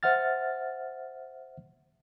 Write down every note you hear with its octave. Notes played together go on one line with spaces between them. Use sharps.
C5 E5 F#5 F6 A6